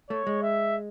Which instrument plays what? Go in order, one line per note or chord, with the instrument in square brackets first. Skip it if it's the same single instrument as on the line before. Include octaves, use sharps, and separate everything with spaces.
[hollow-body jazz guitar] A3 [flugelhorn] C#5
[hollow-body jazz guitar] G#3
[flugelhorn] E5